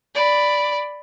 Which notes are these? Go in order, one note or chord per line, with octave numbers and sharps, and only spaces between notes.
D5 B5